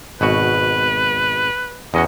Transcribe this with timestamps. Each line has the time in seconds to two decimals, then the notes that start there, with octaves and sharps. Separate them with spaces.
0.21 G#1 B2 F#4 B4
1.94 E2 C#4 F#4 D#5